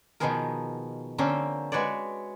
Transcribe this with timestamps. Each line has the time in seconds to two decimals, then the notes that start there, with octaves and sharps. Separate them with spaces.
0.20 B2 D#3 F3 B3 G#4 A#4
1.18 D3 A#3 C4 C#4 A#4 C5
1.72 G#3 F#4 B4 C#5 D5